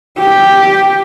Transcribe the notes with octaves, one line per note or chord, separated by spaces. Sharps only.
G4